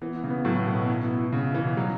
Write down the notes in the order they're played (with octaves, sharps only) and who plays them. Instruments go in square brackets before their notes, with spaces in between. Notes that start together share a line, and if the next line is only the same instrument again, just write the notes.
[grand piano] E3 [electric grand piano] B3
[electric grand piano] B3
[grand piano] C#3
[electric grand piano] B3
[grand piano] A2 [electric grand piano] F#3
[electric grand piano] B3
[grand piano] B2
[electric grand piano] B3
E4
B3
E4
[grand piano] C#3 [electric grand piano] B3
[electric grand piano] E4
[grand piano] E3
[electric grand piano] B2
[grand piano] F#3 [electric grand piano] G3